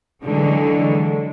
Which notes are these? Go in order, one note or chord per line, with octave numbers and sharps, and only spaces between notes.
D3 E3 F#3 G#3